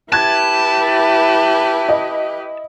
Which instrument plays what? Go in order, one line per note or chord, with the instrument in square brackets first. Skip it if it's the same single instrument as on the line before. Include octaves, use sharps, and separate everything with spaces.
[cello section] E4 [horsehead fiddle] G4 B4 [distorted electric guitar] A5 [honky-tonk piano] F#6 G#6
[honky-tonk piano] D#5